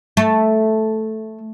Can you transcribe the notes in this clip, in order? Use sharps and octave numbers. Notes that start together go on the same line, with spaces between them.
A3